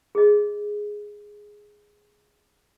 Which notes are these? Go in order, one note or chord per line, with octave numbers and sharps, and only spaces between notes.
G#4 D#5